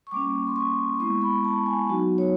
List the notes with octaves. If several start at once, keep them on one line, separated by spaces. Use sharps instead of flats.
C#6
G3 A#3 C#4 D6
C6
C#6
G#3 B3 E4 C#6
B5
A5
G#5
F#3 B3 D#4 F#4
C#5